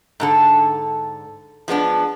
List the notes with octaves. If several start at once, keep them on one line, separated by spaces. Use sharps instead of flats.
G#2 D3 A4
F3 G#3 B3 D4